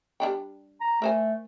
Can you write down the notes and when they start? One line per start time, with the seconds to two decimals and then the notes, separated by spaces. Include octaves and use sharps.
0.20 G3 D4 G5
0.81 A#5
1.02 A3 A#4 C5 G#5